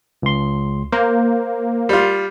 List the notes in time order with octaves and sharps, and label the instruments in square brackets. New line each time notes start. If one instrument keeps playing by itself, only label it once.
[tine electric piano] C#2 C6
[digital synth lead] A#3 [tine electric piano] C5
[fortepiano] G3 F4